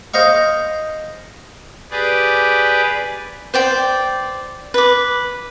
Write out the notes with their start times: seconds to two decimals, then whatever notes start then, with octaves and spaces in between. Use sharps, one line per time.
0.14 C5 D#5 F5 C#6
1.91 G4 G#4 B4 D5
3.54 C5 D5 G5
4.74 B4 D6